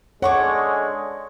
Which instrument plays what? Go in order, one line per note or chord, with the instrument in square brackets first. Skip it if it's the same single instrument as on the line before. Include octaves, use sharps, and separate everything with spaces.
[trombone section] D3 G#3 [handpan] C#5 [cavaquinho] F#5 C#6 D6